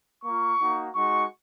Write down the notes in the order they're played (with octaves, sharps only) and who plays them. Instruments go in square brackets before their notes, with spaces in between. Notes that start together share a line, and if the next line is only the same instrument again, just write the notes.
[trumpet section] A#3 F4 C#6
A#3 D#4 F#4
G#3 D#4 F#4 C#6